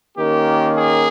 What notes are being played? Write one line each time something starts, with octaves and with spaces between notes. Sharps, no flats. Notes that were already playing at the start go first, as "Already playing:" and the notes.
D#3 A#3 C#4 G4
G#4